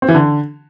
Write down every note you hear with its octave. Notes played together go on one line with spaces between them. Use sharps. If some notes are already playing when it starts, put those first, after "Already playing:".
C4
E3
D3